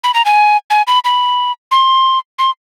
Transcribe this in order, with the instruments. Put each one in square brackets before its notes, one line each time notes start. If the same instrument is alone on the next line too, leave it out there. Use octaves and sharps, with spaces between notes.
[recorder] B5
A#5
G#5
G#5
B5
B5
C6
C6